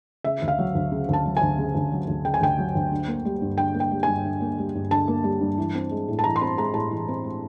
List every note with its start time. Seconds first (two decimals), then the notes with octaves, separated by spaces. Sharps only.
0.24 C#3 E5
0.42 D2
0.48 F5
0.59 F#3
0.75 D2
0.92 C#3
1.09 D2 A5
1.25 F#3
1.37 G#5
1.42 D2
1.58 C#3
1.75 D2
1.92 F#3
2.08 D2
2.25 C#3 G5
2.34 G#5
2.41 D2 G5
2.58 F#3
2.75 D2
2.92 D3
3.07 A#3
3.25 G3
3.42 G2
3.58 D3 G5
3.74 A#3
3.80 G5
3.91 G3
4.03 G2 G#5
4.25 D3
4.41 A#3
4.58 G3
4.75 G2
4.91 D3 A5
5.08 A#3
5.24 G3
5.41 G2
5.58 E3
5.75 C4
5.91 G#3
6.08 A2
6.19 A5
6.24 E3 A#5
6.36 C6
6.41 C4 B5
6.57 G#3 A#5
6.74 A2 A5
6.91 E3
7.08 C4
7.24 G#3